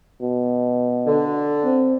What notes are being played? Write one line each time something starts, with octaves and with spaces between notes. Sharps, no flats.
B2
D3
C4